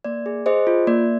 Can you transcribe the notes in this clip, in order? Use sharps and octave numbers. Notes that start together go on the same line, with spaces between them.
A#3 D5
G#4
G#4 C5 D#5
F4
A#3 D5